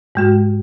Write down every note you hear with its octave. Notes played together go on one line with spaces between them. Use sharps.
G#2 G#3 F#4